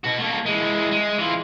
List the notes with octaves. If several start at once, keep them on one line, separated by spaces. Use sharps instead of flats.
B2 F#4
A3 A#3
E3 G#3
G#3
E3 F4